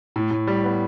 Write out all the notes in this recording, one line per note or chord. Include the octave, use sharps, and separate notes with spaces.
A2
A2
G3
B3